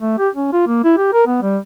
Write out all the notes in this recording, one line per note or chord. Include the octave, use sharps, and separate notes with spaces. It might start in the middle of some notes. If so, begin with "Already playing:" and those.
A3
G4
C#4
F4
A#3
E4
G4
A#4
B3
G3